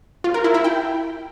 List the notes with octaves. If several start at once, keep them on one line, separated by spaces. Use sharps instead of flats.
F4
A#4
E4
E4
G5